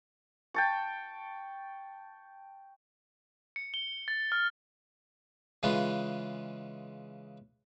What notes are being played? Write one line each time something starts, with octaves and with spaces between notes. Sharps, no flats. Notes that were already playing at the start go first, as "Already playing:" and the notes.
G5 A5 C#6
C#7
G7
A6
F6
C#3 E3 G#3 F4 B4